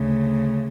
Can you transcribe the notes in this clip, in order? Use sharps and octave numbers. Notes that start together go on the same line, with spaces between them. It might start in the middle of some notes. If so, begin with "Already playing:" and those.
Already playing: D2 C#3